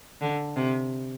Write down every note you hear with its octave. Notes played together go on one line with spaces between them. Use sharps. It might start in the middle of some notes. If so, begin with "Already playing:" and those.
D3
C3